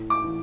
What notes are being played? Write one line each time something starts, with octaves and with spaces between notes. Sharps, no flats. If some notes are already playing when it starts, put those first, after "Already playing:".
Already playing: A2
D6
E3